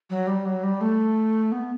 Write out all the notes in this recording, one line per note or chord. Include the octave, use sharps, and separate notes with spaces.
F#3
G3
F#3
G3
A3
B3